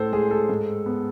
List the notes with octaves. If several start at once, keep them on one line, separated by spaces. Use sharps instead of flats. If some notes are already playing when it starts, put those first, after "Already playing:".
Already playing: A2 A4 C5
G#3 G#4
A4
G#2
B3